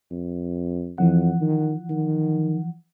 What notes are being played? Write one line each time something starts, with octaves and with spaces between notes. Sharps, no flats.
F2
F2 E3 F3 F#5
D#3
D#3